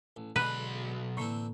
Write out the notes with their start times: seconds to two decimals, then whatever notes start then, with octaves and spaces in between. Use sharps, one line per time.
0.16 A1
0.36 B1 B2 D3 G#3 B4 B5
1.17 A2 D3 E3 A#3 C4